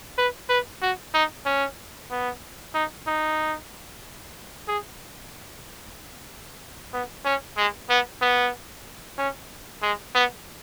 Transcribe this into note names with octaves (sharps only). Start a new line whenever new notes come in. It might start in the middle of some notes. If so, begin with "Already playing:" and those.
B4
B4
F#4
D#4
C#4
B3
D#4
D#4
G#4
B3
C#4
G#3
B3
B3
C#4
G#3
B3